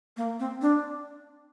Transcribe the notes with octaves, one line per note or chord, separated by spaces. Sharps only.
A#3
C4
D4